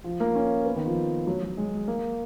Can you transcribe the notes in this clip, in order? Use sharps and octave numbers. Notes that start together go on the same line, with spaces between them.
F3
A#3
C#4
B3
D#3
F3
F#3
F#3
G#3
A#3